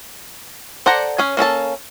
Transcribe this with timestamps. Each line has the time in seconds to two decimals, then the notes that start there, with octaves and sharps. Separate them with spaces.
0.86 A4 C5 D5 F#5 A#5
1.18 C#4 G#4 G#5
1.37 A#3 C#4 A4 A5